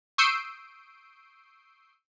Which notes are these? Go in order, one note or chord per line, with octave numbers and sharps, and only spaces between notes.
C#6 D#6 E6 G6 C7 D7